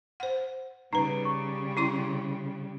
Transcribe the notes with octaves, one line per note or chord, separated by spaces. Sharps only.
C5 F#5
C#3 G3 D#4 B4 A#5
C#6
C#4 E4 C6